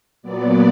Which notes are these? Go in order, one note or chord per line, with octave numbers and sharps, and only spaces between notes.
A#2 F#3 B3 D5